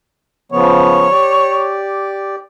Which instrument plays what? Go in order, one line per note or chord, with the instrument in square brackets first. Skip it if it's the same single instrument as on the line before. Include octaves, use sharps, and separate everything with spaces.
[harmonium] C#3 F3 B3 [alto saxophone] C#5
[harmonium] G4 D5